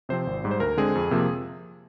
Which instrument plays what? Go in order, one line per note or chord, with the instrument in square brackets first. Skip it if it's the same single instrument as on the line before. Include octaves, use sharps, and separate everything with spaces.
[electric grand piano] C3 F3 C4 C5
G#1
G#2 G3
C5
D2 A#4
D3 G#3 C4 G#4
F2
C3 F3 A#3